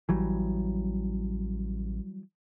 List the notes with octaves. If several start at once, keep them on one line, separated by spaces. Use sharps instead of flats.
A1 E3 F#3 G3